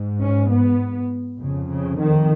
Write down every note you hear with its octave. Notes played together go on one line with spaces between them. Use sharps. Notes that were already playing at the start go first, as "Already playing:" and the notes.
Already playing: G#2
C#4
B3
F2 C#3
C#3
D#3